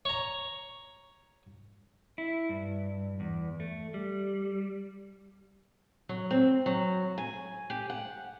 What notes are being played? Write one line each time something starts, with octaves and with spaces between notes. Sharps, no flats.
C#5 A#5
E4
G2
E2
A3
G3
F#3
C4
F#3
G#5
G4
F#5